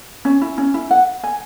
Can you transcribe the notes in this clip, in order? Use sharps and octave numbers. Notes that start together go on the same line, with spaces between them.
C#4
E4
C#4
E4
F#5
G#5